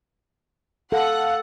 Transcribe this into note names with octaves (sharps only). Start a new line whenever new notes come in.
A4 F5 F#5